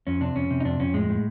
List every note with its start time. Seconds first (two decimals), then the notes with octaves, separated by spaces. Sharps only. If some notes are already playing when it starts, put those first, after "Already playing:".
0.07 F2 C#4
0.21 C3 D4
0.36 F2 C#4
0.50 C3
0.60 D#4
0.65 F2 D4
0.80 F2 C#4
0.94 A2 G#3
1.09 A2